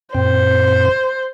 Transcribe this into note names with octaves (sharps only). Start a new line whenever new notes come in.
F#2 A#2 C4 C5